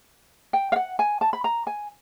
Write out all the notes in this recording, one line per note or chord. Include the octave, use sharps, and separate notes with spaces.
G5
F5
F#5
G#5
A5
B5
A#5
G#5